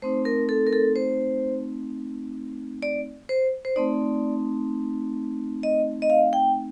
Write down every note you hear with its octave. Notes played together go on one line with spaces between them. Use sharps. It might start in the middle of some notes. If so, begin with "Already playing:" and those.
A3 C4 D#4 C5
A#4
A4
A#4
A4
C5
D5
C5
C5
A3 C4 D#4 D5
D#5
D#5
F5
G5